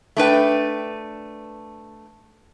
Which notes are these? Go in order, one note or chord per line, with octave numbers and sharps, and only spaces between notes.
A3 D4 B4 G5